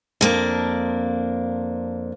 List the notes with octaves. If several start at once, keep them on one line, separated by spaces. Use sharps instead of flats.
F2 A#3 D4